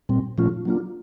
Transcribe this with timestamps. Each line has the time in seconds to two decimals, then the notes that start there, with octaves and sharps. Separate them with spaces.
0.09 A#2 G3 C4
0.38 A#2 F3 A3 C#4 F4
0.65 F#3 A#3 D4 F4